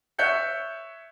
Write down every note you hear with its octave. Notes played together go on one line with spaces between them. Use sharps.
C#5 E5 F#6 G6 C#7